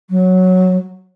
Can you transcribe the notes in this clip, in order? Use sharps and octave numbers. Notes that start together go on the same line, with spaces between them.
F#3